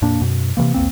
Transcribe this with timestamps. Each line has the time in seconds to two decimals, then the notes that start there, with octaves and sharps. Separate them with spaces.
0.02 F2 A#2 A#3 D4
0.21 F#2 B2
0.57 C3 D#3 E3 A#3
0.74 B1 E2 A#3 C4